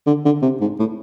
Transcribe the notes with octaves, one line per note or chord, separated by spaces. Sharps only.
D3
D3
C3
G#2
A2